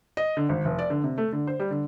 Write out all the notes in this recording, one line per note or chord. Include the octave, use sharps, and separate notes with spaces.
D#5
D3
G#1
F1
D5
D3
C3
A3
D3
C5
G3
D3